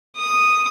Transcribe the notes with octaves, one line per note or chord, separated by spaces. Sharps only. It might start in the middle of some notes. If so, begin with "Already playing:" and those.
D#6